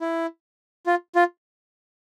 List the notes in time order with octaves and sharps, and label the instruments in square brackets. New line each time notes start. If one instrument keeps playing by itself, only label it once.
[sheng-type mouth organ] E4
F4
F4